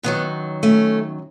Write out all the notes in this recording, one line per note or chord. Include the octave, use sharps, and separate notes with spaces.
F#2 D#3 F#3 G#3 B3
A3 C#4